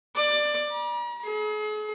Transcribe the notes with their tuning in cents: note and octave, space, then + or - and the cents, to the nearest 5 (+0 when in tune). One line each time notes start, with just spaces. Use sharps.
D5 +15
A#5 +45
G#4 +40